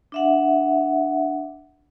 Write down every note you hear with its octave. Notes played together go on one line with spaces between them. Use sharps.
D4 E5 F#5